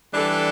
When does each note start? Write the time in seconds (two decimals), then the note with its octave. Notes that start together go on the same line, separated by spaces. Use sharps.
0.13 E3 G3 D4 A4